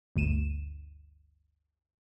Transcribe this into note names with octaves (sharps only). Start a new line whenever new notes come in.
G1 D2 D#7 E7